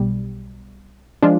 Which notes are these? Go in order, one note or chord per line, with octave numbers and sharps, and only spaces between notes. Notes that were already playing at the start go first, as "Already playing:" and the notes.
Already playing: B1 B2 G3
F3 G#3 D4 F4